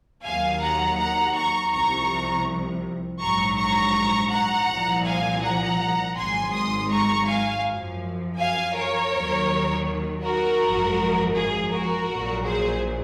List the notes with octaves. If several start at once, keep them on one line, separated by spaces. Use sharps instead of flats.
D#2 D#3 F#3 F5 G#5
F#5 A#5
F#5 A#5
A#5 C#6
C2 C3 F3 A#5 C#6
A#1 G#2 F#3 A#5 C#6
A#5 C#6
F#5 A#5
C2 A#2 F3
F5 G#5
F#5 A#5
G#1 G#2 F#3 G#5 C6
C6 D#6
A#5 C#6
F5 G#5
F#2 F3
F5 G#5
A#4 C#5
D#2 D#3 F#3
F#4 A#4
G#1 F#2 F3
G#4
F#4 A#4
A#1 A#2 F#3
G#4 C5